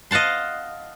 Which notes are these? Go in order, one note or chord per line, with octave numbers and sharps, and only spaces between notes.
D#5 F5 F#5 A5 C6